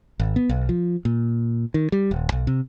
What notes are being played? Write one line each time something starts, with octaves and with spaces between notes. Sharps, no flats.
G#1
B3
B1
F3
A#2
D#3
G3
D#1
B1
C3